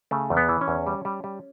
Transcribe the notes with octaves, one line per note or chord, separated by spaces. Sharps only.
C#3 A3
E2
B3
E3
C#4
E2
G3
G3
G3